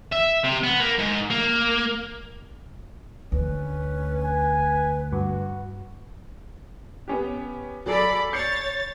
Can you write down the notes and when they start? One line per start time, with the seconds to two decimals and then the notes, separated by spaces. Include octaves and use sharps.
0.13 E5
0.44 C3
0.64 B3
0.80 A#3
0.98 G#2
1.30 A#3
3.32 D2 C#4 B4
4.23 G#5
5.12 G2 F#4
7.08 B3 C#4 G4
7.86 F#3 G#4 A4 D5 B5
8.33 C#5 G6 A6 C7 C#7